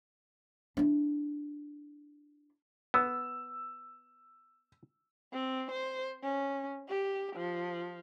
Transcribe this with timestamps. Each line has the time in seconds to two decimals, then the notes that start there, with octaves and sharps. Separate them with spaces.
0.77 D4 E4
2.94 B3 E6
5.33 C4
5.71 C5
6.23 C#4
6.89 G4
7.36 F3